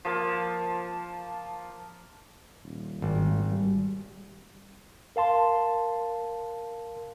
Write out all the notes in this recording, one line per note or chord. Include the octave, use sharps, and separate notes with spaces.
F3 A#3 A5
D#1
G#1
G3
A#4 F5 A5 C6